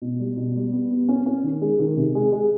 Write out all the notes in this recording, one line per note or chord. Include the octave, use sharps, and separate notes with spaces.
B2
G3
B2
G3
B3
B3
C#4
C#4
D#3
G#3
D#3
C3
G#3
G#3